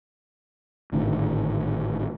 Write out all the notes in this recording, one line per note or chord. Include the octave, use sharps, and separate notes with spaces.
G#1 A2 D3 D#3